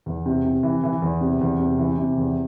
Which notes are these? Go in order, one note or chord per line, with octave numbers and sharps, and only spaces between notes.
E2
C3
C3
E3
E3
E2
C3
E2
C3
E3
C3
E2